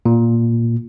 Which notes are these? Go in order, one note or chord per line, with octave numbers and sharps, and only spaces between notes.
A#2